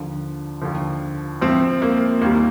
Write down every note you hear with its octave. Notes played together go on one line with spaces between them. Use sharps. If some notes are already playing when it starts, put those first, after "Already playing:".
Already playing: D#2 D3 F3
D#2 D3 F3
A2 F3 C4
A#3
D#2 D#3 G3 A#3